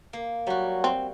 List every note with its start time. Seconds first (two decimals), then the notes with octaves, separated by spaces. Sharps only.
0.13 A#3
0.47 F#3 G3 F#4
0.84 C4